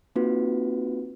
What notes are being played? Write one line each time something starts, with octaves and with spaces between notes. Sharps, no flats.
A#3 C4 D#4 F4 F#4 B4